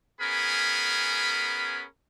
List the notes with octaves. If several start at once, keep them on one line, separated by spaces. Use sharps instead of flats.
B3 C#4 G#4 A#4 B5